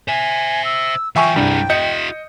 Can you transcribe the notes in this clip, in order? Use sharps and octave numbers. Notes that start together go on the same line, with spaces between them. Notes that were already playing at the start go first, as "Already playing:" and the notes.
C5 E5 G#5
E6
E3 F4 E5 G5 G#5 C#6
C2 G2 G3 G#4
E4 F#4 D#5 G6 C#7